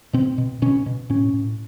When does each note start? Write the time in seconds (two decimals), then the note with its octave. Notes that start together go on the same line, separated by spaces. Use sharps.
0.13 B2 C4
0.38 B2
0.62 B2 C#4
0.86 B2
1.10 A2 C#4
1.34 A2